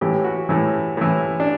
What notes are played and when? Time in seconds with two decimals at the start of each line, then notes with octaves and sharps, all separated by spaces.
0.01 A2 E3 G4
0.24 F#4
0.49 A2 E3
0.97 A2 E3
1.40 D4